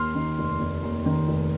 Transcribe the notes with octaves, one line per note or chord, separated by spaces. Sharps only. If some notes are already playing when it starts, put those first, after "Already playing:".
Already playing: D#2 C6 F6
D#3
F1
F1
D#2
D#3
F1